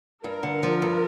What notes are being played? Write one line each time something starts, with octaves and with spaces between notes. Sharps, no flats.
G2 A#4
D3
F3
G2